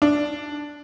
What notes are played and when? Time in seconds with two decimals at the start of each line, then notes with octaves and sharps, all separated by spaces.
0.02 D4